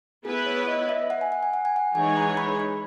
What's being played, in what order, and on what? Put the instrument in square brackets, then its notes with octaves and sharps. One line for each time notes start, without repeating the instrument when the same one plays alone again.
[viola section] B3 E4 B4 [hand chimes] G#4
[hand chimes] C#5
C#5
D#5
E5
F#5
G#5
F#5
G#5
F#5
G#5
F#5
[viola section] E3 G#3 D#4 G#4 C#5 [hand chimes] G#5
[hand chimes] A#5
B5
B5